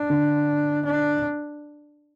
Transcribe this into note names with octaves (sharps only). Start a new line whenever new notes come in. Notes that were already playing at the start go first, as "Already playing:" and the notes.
Already playing: D4
D3
D4